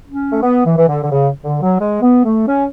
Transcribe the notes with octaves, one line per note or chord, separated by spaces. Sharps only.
C#4
A3
B3
E3
E3
D3
D3
C#3
D3
F#3
G#3
B3
A3
C#4